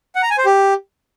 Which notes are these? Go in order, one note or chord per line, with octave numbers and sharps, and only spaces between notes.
F#5
A#5
G#5
C5
G4